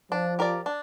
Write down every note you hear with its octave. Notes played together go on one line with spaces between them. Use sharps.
F3 D4
G4 A#4 D5
D4